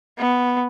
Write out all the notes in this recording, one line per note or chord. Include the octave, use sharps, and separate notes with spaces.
B3